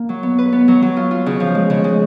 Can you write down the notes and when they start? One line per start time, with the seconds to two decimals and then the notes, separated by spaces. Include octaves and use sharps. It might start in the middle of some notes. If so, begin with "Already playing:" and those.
Already playing: A#3
0.09 F#3
0.23 B3
0.38 B4
0.53 B3
0.68 F#3
0.82 F#3
0.97 F4
1.11 F4
1.26 C#3
1.40 F3
1.55 G#3
1.70 C#3
1.84 G#3